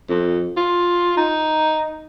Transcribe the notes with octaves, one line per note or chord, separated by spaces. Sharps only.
F2
F4
D#4